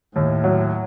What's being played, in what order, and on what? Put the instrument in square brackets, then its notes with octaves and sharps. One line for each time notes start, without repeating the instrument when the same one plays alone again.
[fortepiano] D#2 [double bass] A2
[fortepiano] F#3